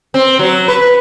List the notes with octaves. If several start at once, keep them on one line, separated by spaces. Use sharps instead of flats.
C4
F#3
B4